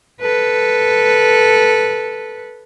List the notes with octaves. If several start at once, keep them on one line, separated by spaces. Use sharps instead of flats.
A4 B4